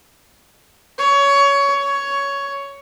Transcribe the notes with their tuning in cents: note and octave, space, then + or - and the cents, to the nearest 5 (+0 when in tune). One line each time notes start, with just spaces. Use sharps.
C#5 +20
C#5 +10